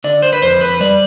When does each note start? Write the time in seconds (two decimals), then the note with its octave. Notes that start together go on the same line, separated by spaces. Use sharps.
0.04 D3 D5
0.22 C5
0.33 B4
0.42 F2 C5
0.61 B4
0.80 G3 D5